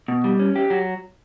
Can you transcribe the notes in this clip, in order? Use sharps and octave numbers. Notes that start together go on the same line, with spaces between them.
B2
G3
C#4
G4
F#3